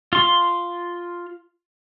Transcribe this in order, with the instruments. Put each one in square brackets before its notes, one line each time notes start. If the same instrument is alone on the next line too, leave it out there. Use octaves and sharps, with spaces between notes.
[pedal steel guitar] F4 C6